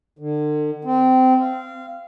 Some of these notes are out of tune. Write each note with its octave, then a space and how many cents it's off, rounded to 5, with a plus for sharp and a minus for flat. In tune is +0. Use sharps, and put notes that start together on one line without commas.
D3 +40
C4 -20
F5 -25